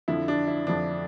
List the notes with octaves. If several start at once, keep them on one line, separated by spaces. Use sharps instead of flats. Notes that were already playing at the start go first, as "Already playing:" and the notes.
F2 D3 F3 E4
D4
E4
F2 D3 F3 D4